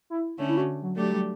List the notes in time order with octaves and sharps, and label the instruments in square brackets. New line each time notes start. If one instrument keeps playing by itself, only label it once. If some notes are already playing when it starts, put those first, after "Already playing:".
[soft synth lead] E4
[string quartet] D3 A3 C#4
[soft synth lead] E4
F#4
F#3
[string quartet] F#3 A3 D4 G4
[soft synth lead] G3